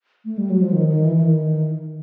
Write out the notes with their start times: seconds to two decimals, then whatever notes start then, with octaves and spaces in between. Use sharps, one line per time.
0.25 A3
0.38 G3
0.50 F#3
0.62 F3
0.72 D#3
0.89 D#3
1.05 E3
1.20 D#3